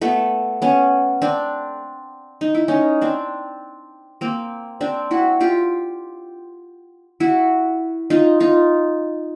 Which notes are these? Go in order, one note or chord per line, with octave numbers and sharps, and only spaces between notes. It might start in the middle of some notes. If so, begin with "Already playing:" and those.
A3 B3
B3 C#4
C4 D4
D#4
E4
C#4 D#4
C4 D4
A#3 C4
C4 D4
E4 F#4
F4 G4
E4 F#4
D#4 F4
D#4 F4